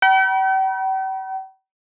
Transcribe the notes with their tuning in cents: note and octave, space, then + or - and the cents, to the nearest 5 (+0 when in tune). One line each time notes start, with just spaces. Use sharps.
G5 -45 B5 -45